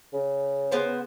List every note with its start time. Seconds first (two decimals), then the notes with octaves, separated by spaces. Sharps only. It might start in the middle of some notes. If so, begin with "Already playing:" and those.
0.13 C#3
0.71 G#3 B3 C5